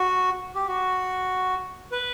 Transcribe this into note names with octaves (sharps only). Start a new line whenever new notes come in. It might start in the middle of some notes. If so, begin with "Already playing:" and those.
Already playing: F#4
G4
F#4
B4